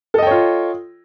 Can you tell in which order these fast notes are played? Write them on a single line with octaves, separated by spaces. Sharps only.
A4 D#5 G5 C#5 F4